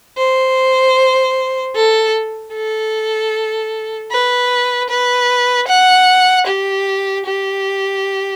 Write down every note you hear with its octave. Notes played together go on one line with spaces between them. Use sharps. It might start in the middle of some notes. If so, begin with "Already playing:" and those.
C5
A4
A4
B4
B4
F#5
G4
G4